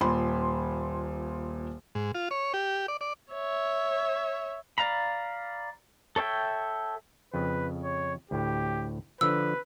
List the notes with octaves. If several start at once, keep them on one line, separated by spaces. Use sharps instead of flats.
D#1 A#2 B5 C6
G#2
F4
C#5
G4
D5
D5
C#5 E5
D5 F5 A#5 B5
A4 C#5 E5 G5
F2 C#3 B4
C#5
D2 A2 G4
D3 F3 B4 E6